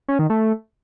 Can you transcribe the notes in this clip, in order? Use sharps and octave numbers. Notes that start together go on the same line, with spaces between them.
C#4
D#3
A3